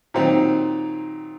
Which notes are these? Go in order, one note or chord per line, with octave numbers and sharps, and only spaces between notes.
A#2 D#3 F#3 C4 D#4